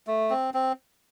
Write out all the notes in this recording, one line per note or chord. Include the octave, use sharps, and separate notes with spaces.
A3
C4
C4